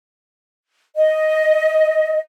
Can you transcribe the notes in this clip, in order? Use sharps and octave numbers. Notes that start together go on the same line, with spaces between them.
D#5